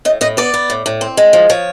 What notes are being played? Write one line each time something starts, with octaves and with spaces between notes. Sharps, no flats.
A2 D#5
A2 D#5
B3 D5
B3
A2
A2
C4
G#3
F3
F3 C#5